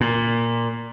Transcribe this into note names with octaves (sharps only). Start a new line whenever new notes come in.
A#2